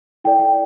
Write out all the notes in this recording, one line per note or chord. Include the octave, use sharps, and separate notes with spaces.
E4 A4 D5 G5
G5